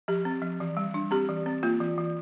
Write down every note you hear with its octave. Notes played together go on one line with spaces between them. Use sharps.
F3 G4
C4
F3
E3
G3
D4
C4 G4
E3
C4
A#3 F4
E3
E3